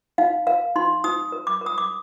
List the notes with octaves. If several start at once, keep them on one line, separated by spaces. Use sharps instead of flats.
D#4 F5
A#4 F5
D#4 C6
D#4 D#6
A#4
D6
A#4
D#6
D6